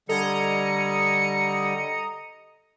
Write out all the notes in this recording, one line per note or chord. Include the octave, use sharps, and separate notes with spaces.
D3 G3 A4 D#5 A#5 D#6 G#6 C#7